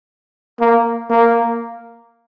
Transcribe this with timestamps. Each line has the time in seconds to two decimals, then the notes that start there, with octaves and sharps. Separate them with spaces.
0.60 A#3
1.10 A#3